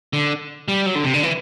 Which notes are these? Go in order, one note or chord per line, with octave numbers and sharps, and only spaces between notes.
D3
G3
F#3
D3
C3
D3
E3